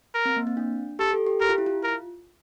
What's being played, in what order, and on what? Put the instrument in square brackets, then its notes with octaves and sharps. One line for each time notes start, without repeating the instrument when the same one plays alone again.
[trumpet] A#4
[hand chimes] C4
A#3
C4
D4
[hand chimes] G4 [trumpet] A4
[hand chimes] A4
G4
[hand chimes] G4 [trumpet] A#4
[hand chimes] F4
E4
F4
[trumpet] A#4